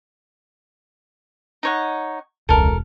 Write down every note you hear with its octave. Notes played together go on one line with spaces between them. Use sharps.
D#4 C#5 F#5
E1 C#2 A4 A#4